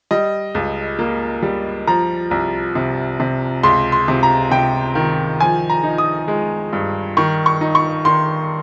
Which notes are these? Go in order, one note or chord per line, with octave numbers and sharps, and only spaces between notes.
G3 D#5
C#2
A#3
G3
F3 A#5
C2
C3
C3
C#2 C6
C6
C3
A#5
C3 G5
D#3
F3 G#5
A#5
D#4
D#6
G#3
G2
D#3 C#6
C#6
D#4
C#6
D#3 C6